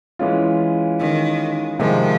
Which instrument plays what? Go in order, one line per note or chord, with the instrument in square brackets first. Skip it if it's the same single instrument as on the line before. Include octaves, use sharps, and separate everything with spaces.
[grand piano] E3 G#3 C#4 F4
[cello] D#3
[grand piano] C3 D#3 G#3 C4 [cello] F3